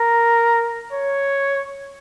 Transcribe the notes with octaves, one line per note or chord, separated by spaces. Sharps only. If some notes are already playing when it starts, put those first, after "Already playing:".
Already playing: A#4
C#5